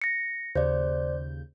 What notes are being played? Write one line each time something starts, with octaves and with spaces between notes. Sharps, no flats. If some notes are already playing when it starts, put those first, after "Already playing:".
A#6 C#7
D#2 C#3 C5 D5 G6